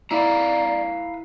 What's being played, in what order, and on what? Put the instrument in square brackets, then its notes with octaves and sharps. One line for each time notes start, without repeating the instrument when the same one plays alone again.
[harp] E4 [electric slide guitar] B4 F5 A#5 [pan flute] D5